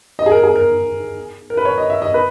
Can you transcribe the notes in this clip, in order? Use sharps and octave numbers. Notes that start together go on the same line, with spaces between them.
D#5
G#4
A#4
G#4
A#4
A#4
B4
C#5
D#5
E5
D#5
B4